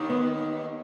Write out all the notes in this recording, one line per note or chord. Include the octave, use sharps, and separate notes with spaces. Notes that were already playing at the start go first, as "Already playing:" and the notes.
Already playing: D#2 D#3
B3